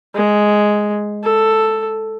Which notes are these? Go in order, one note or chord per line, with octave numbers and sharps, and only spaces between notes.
G#3
A4